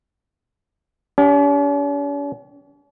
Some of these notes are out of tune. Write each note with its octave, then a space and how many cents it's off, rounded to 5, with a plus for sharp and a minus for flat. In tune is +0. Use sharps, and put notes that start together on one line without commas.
C#4 +45 G4 +0